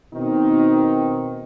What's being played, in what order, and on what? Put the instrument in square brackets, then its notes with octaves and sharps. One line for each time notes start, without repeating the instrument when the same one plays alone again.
[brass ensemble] B2 D#3 C4 D#4